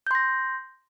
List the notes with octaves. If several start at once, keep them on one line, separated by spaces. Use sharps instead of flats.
C6 G6 A#6